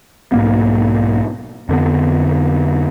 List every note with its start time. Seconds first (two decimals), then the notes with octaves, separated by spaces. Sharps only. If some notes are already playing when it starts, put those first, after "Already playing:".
0.32 B1 G#2 A#3 B3
1.69 F2 D3 B3